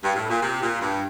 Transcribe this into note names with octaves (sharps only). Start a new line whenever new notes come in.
G2
A2
A#2
C3
A#2
G2